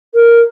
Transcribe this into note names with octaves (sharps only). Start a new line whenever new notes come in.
A#4